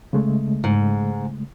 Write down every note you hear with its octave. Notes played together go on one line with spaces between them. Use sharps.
C#3 G#3 A3
G#2